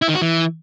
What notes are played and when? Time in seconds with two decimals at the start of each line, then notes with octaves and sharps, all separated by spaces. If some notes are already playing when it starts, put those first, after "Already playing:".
0.02 E4
0.08 D#3
0.15 F#4
0.22 E3